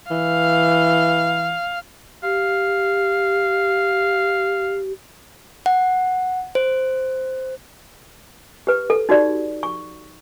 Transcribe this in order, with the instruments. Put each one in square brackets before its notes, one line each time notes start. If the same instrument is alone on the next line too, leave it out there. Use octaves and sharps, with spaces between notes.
[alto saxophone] E3 [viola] F5
[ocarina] G4 [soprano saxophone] F5
[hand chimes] F#5
C5
[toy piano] G4 B4
A4
D#4 F#4 G4 D5
C#6